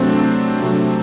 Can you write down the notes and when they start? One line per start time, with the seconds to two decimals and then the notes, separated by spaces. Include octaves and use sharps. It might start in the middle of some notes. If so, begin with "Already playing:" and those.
Already playing: C3 F#3 A3 C4 D4 C5
0.60 C3 F#3 A3 D4